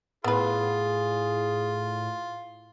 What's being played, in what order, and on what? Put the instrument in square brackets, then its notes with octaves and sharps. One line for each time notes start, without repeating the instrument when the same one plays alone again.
[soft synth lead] A2 [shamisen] B3 B4 [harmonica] F4 [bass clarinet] G#4